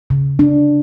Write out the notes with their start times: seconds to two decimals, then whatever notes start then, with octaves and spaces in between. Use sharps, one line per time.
0.10 C#3
0.39 D4